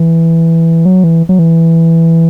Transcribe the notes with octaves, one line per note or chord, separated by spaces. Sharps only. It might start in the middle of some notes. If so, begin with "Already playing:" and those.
Already playing: E3
F#3
E3
F#3
E3